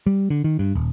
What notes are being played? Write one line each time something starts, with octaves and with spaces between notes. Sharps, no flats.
G3
D3
D#3
G2
D#1